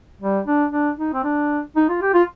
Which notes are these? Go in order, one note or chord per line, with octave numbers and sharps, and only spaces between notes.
G3
D4
D4
D#4
C4
D4
D#4
F4
G4
F4